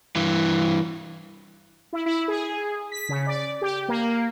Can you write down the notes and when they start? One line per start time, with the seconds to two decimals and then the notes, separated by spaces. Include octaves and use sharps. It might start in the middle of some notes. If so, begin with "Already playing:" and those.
0.16 G2 E3
1.93 E4
2.06 E4
2.28 G#4
2.92 B6
3.09 C#3
3.27 D5
3.61 G4
3.88 A#3